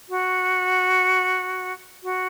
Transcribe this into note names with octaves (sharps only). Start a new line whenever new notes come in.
F#4
F#4